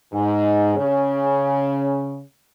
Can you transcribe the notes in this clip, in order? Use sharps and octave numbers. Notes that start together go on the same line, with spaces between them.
G#2
C#3